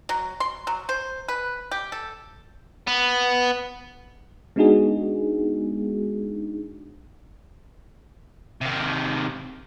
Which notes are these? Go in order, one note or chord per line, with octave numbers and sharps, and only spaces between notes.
F#3
C6
F#3
C5
B4
G4
A4
B3
G#3 B3 D4 D#4 F#4 G#4
C3 D#3